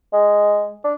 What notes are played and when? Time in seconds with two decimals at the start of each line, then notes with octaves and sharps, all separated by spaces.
0.13 G#3
0.84 D4